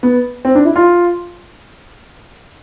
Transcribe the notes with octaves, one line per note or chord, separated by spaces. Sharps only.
B3
C4
D4
E4
F4